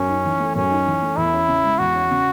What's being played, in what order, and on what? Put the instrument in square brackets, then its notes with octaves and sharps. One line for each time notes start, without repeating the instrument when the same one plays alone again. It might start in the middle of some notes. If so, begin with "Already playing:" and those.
Already playing: [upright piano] F#2 [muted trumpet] C#4
[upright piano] D#4
E3
A3
[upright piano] F#2 [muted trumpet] C#4
[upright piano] D#4
E3
A3
[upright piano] E2 [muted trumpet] E4
[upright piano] C#4
C#3
G#3
[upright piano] E2 [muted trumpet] F#4
[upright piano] C#4
C#3